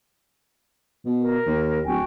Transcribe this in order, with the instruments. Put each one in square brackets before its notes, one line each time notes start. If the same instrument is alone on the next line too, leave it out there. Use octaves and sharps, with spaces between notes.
[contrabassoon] B2
[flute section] A#4
[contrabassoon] D#2
[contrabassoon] D1 [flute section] F#4 G5 G#5